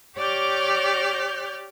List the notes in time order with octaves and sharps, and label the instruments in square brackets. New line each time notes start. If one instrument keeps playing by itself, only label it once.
[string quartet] G4 C#5 D5 D6 F6 G6